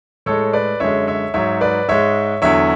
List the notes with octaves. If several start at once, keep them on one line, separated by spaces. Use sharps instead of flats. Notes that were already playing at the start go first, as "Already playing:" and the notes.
A2 G#3 A4 C#5
B4 D5
F#2 D3 G#3 C#5 E5
C#5 E5
G#2 F#3 C#5 E5
B4 D5
G#2 G#3 C#5 E5
E2 D3 F#3 C#5 E5